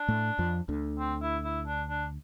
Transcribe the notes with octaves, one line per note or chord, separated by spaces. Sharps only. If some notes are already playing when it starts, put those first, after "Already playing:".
Already playing: D4
A2 A3
F2 F3
D2 D3
C4
E4
E4
D4
D4